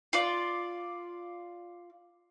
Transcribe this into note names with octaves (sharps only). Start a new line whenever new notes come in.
F4 D5